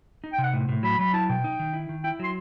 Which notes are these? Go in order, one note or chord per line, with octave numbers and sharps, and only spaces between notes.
D#4
G5
C3
F#5
A2
A2
F#3 B5
F#3 B5
E4 A5
B2 G5
D#4
D#3
E4
D#3
E4 G5
F#3 C6